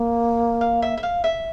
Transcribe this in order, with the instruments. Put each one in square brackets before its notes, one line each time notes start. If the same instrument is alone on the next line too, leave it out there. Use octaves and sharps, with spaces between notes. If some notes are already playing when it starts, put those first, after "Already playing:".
Already playing: [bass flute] A#3
[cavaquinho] F5
E5
E5
F5
E5